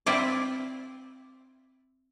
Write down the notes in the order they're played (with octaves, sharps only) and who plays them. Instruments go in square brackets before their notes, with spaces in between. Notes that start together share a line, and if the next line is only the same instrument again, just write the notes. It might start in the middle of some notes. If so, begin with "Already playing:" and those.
[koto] C4 E4 F4 D5